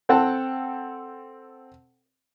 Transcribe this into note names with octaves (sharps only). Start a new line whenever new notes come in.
C4 A4 F#5 G5 A5